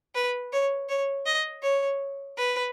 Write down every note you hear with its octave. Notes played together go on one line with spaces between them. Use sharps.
B4
C#5
C#5
D#5
C#5
B4